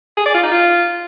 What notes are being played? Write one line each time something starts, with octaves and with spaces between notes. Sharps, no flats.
G#4
D5
F4
D#4
F4